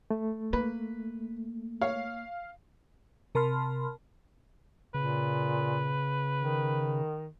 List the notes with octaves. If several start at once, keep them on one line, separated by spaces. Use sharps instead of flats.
A3
A#3 B4
C#5 F5
C3 A#4 A5 B5 C6 F6
A#2 C#3 B4
D#3